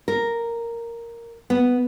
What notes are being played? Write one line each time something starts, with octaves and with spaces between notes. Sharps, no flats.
A#4
B3